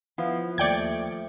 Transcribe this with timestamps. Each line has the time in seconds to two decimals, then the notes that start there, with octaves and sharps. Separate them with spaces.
0.18 F3 B3 E4
0.58 D#2 A3 D5 G5 G#6 C#7